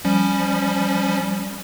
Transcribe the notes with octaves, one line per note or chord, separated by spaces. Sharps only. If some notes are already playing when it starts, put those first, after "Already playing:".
F3 G3 C#4